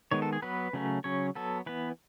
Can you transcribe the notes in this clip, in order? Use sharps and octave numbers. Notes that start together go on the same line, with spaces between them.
D#3 G#3 B3 C#5
A4
G#4
F#3 B3 B4
C#3 F#3 A3 C#4
C#3 F#3 C#4 C#5
F#3 B3 A4
E3 B3 B4